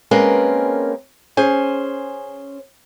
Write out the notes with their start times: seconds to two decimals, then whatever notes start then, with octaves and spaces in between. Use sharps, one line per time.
0.11 G#3 A#3 C4 C#4 A#4 B4
1.37 C#4 G#4 C5 G#5